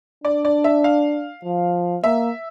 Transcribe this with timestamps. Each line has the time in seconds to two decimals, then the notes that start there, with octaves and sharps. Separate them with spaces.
0.24 D4 D5
0.45 D5
0.64 E5
0.84 F5
1.44 F3
2.04 A#3 E5